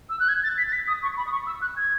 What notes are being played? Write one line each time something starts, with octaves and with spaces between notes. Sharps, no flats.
E6
F#6
G#6
A6
B6
A6
B6
D#6
C#6
B5
D#6
C#6
E6
F#6
G#6